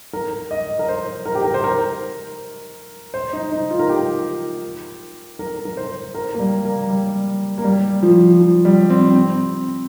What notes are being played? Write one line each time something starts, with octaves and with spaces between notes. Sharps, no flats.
A#4
D#5
A#4
C5
A#4
G4
A#4
C5
A#4
C5
D#4
D#4
F4
A#4
G4
A#4
A#4
C5
A#4
A#3
G3
A#3
G3
A#3
G3
F3
F3
G3
C4
C4